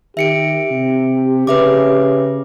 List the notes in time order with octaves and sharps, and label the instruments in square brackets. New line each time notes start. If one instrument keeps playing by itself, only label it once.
[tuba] D#3 [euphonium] G4 [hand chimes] E5 C#7 D7
[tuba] C3
[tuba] C#3 [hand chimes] B4 E5 D6